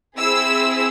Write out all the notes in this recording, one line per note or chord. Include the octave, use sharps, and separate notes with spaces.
C4 E4 G#4 E6